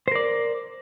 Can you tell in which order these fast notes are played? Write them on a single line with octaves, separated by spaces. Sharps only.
C5 A#4 D5